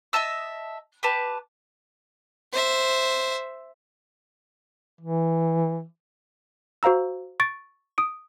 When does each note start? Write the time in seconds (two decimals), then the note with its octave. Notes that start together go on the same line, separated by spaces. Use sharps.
0.13 D#5 E5 A5 E6
1.03 G4 B4 A5
2.52 C5 E5
5.01 E3
6.83 F#4 C5 F5 A#5 E6
7.40 C#6 A6 D7
7.98 D#6 D7